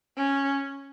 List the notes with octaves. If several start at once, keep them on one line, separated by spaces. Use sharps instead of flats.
C#4